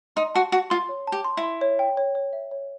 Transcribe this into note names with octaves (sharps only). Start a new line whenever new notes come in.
D#4 C6
F#4 A5
F#4 A5
F4 C6
C#5
G4 A5
C6
E4
C6
C#5
G5
C#5
C#5
E5
C#5